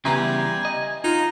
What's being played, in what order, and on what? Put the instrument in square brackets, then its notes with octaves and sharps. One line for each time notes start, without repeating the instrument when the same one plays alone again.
[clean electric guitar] C#3 E3 B3 [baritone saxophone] G3 [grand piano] E5 A#5 C6 [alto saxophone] G#5
[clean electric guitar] D#5
[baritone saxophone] D#4 [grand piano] F4